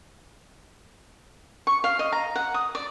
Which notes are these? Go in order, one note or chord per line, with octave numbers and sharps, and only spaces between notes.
C#6
F5
D#5
A#5
F#5
D#6
D5